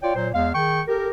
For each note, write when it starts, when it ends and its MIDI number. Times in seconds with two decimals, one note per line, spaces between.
0.02 0.12 65
0.02 0.12 73
0.02 0.12 74
0.02 0.12 79
0.16 0.28 46
0.16 0.28 54
0.16 0.28 72
0.34 0.49 40
0.34 0.49 56
0.34 0.49 77
0.55 0.81 51
0.55 0.81 68
0.55 0.81 79
0.55 0.81 85
0.88 1.10 67
0.88 1.10 69
0.88 1.10 70